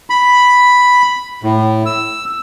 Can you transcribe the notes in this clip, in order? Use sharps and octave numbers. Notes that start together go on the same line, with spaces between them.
B5
A2
E6